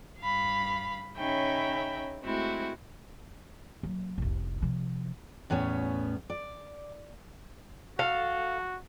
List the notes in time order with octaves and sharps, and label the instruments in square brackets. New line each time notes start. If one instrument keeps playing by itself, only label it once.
[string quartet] G2 F5 B5
C#3 C#4 D#4 E5 G5 B5
G#3 A3 C4 E4 F#4
[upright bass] F#3 A#3
F1 C2
C3 F3
[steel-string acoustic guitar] E2 A2 B3 C#4
D5
[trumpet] F#4 [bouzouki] A4 F5